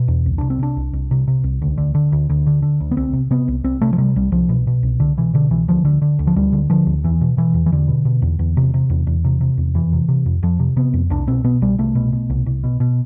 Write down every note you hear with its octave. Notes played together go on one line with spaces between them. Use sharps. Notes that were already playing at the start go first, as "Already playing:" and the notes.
Already playing: B2
E2
C2
C3 D4
C4
C3 D4
C2
C2
C3
C3
C2
D2
D3
D3
D2
D2
D3
D3
D2
B3
C2 C4
C3
C3 B3
C2
C2 C4
C3 A3
F3
C3 G3
C2 G3
C2 F3
B2
B2
C2
C2 D3
B2 E3
B2 D3
C2 E3
D2 F3
D3
D3
D2
F3
D2 G3
D3
D3 F3
D2
E2 E3
B2
B2 E3
E2
E3
E2 D3
B2
B2
E2
E2
C3
C3
E2
E2
C3
C3
E2
F2 E3
C3
C3
F2
F2 F3
C3
C3 B3
F2
C2 D4
B2 C4
B2 B3
C2 G3
C2 A3
B2
B2
C2
C2
B2
B2